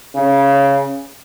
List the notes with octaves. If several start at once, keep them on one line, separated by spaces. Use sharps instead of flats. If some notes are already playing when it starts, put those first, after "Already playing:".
C#3